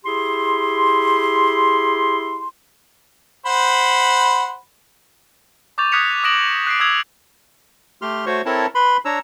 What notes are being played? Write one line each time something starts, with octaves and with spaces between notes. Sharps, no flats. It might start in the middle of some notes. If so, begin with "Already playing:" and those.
E4 G4 G#4 C6
C5 F#5 B5
C#6 D6 G6 A6 F7
D#6 F#6 G#6 B6 C#7 F7
D#6 F#6 A#6 D7 E7 F#7
F#6 C7 D7
D#6 E6 G#6 F7 F#7
A3 G4 C6 F6
A3 F#4 C5 C#5 C#6
C4 E4 A4 A#4 C#5 A5
B4 B5 C6
D4 C#5 A#5 E6